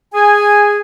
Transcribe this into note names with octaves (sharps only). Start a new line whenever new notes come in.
G#4 G#5